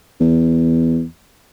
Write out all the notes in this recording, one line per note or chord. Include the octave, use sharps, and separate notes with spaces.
E2